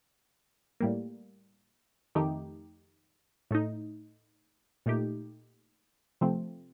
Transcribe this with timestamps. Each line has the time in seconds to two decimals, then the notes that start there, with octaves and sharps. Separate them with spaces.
0.80 A2 G3 A#3
2.15 F2 D#3 A3 D#4 G4
3.51 A2 A3 D#4
4.86 A#2 A3 D#4 G4
6.21 C3 F3 A3 C4